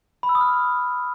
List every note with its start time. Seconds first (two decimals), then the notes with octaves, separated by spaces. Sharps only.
0.23 B5
0.29 E6
0.35 D#6
0.41 F6